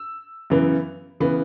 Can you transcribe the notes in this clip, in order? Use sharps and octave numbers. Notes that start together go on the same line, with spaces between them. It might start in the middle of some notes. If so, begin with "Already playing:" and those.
Already playing: E6
F#2 C#3 E3 B3
C#3 E3 B3